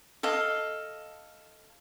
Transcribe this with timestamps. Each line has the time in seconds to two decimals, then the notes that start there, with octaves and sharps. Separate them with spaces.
0.23 A4 D#5 F5